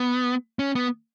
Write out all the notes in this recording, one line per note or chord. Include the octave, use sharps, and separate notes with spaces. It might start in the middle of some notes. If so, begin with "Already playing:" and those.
Already playing: B3
C#4
B3